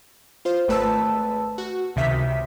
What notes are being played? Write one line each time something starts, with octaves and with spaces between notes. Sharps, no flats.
F4 C5
G#1 A3 B4 A5 E6
F#4
C#2 C3 D#3 E5 B6